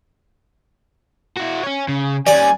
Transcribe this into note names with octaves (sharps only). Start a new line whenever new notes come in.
E4 F#4
C#4 C#5
C#3
G3 C#4 D5 G#5